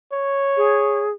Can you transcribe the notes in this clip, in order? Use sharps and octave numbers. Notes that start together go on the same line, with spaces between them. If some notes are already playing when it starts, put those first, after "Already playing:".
C#5
G#4